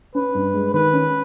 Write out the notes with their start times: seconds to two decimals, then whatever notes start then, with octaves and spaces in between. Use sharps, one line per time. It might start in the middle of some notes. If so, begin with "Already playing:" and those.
0.15 C#4 B4
0.35 G2
0.54 G#3
0.74 D#3 B4
0.93 C#4